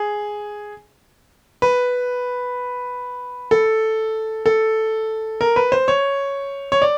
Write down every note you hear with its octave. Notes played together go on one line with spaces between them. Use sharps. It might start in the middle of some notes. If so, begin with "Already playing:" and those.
Already playing: G#4
B4
A4
A4
A#4
B4
C5
C#5
C#5
D5